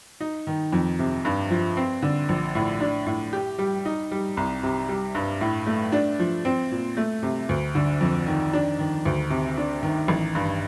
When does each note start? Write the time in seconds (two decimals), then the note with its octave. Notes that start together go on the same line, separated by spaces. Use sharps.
0.20 D#4
0.47 D#3
0.72 F2
0.99 C3
1.25 G2
1.51 F3
1.77 C4
2.02 D3
2.29 A#1
2.55 A2
2.80 D4
3.07 A2
3.33 G4
3.58 G3
3.85 D#4
4.11 G3
4.37 C2
4.63 C3
4.89 G3
5.15 G2
5.41 A2
5.67 A3
5.92 D4
6.19 F3
6.45 C4
6.71 A#2
6.97 A3
7.23 C3
7.49 D2
7.75 D3
8.01 F2
8.27 D#3
8.53 D4
8.79 D#3
9.06 D2
9.30 C3
9.58 D4
9.83 D#3
10.08 A1
10.35 G2